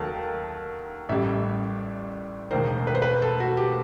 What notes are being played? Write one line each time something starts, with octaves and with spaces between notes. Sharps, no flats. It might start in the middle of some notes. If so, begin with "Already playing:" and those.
Already playing: D#2 D#3 F#3 A3 A5
A1 A2 G3 E5
E1 D#2 D#3 C5
B4
C5
B4
A4
F#4
G4